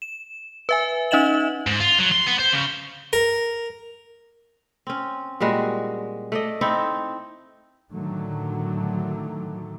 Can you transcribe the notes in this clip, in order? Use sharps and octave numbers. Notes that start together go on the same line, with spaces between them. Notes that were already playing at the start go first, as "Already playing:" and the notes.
E7
B4 E5 G#5
C#4 D#4 D#5 E5 E7 F#7
G#2
F4
F#3
C6
B3
C5
C#3
A#4
C4 C#4
A#2 G3 G#3 F#4
A3 D5 D#5
C4 D#4 E4 A4
A2 D3 D#3 F#3 A3